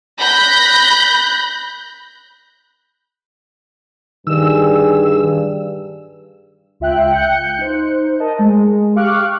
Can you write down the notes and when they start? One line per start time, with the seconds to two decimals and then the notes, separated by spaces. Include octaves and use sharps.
0.19 B5 F#6 G6 A#6
4.27 G2 D#3 G#4 E6
6.80 C#2 F4 E5 G5 F#6
7.13 F#6 G6 C#7
7.58 D#4 C5
8.20 A#4 D#5 A5
8.39 G#3
8.96 G4 F5 C#6 D6 F6 F#6